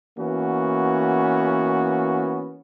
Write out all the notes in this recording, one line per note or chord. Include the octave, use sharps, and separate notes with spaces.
E3 A#3 B3 C#4 F#4